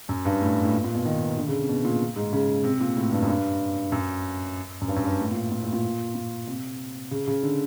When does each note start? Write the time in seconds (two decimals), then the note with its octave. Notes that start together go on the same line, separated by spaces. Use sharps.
0.09 F#2
0.25 G2
0.41 A2
0.64 A2
0.73 A#2
0.84 A#2
0.95 B2
1.05 D#3
1.38 D3
1.48 C#3
1.58 C3
1.69 B2
1.85 A#2
2.16 G#2
2.33 C#3
2.64 C3
2.81 A#2
2.97 A2
3.12 G2
3.22 F#2
3.28 G2
3.92 F#2
4.81 F#2
4.88 G2
4.96 F#2
5.04 G2
5.20 A2
5.31 A#2
5.51 A#2
5.63 A2
5.73 A#2
6.15 A#2
6.47 C3
7.11 C#3
7.28 C#3
7.43 D3